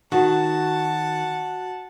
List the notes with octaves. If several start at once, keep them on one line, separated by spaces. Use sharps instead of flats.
D#3 F#4 F#5 A5